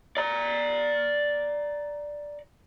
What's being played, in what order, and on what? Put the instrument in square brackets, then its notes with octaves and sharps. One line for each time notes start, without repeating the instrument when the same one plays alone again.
[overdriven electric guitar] D5 A#5